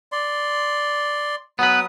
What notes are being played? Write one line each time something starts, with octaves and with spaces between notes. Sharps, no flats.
D5 C6
F#3 B3 B4 D#6